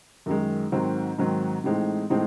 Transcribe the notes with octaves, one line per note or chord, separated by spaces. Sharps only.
F#2 D#3 G#3
G#2 D#3 F#3 C4
G#2 D#3 F#3 C4
A2 E3 G#3 C4 D#4
A2 E3 G#3 C4 D#4